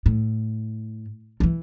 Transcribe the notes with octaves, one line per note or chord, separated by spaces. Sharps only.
A2
D#3 E3